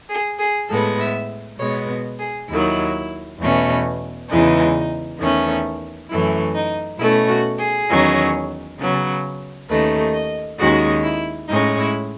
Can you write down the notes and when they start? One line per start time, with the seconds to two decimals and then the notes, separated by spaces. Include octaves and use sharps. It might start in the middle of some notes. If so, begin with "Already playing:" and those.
0.09 G#4
0.39 G#4
0.69 A2 G#3 B3 A4
1.00 E5
1.59 B2 G#3 B3 C#5
2.20 G#4
2.49 D#2 D#3 F#3 E4
3.39 E2 B2 A3 C#4
4.29 E2 C#3 E3 G#3 D#4
5.19 E2 D#3 A3 C#4
6.10 F#2 E3 A3 C#4 E4
6.55 D#4
6.98 B2 A3 C#4 E4
7.29 F#4
7.59 G#4
7.89 E2 D#3 F#3 C#4
8.79 C#3 F#3 B3
9.69 D#2 D#3 A3 C#4 B4
10.14 D#5
10.59 D#2 D#3 G#3 C#4 F#4
11.04 E4
11.49 A2 G#3 C#4 D#4
11.79 E4